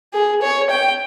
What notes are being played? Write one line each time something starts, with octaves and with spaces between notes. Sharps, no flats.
G#4
C#5
G5